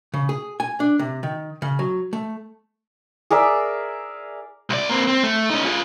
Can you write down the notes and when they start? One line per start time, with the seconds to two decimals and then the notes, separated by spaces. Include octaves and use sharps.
0.14 C#3
0.29 G#4
0.60 G#5
0.80 D4
0.99 C3
1.23 D#3
1.62 C#3
1.79 F#3
2.13 A3
3.30 G#4 A#4 D5 E5
4.70 C2 D5
4.90 A#3 C4
5.07 C4
5.23 A3
5.50 C#4 D#4
5.65 F4 G#4